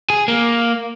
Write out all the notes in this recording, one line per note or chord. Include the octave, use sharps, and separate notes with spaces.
G#4
A#3